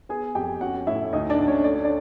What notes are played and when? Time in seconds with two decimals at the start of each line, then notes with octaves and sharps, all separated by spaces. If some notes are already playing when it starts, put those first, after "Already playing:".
0.09 B3 G#4 G#5
0.35 F2 G4 G5
0.61 C#4 F#4 F#5
0.87 A2 E4 E5
1.13 D2 D#4 D#5
1.30 D4 D5
1.38 D2
1.47 C#4 C#5
1.64 A3 D5
1.75 C#5
1.84 D4 D5